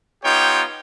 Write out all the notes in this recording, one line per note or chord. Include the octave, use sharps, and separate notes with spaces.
B3 D#4 F4 G4 C#5 G5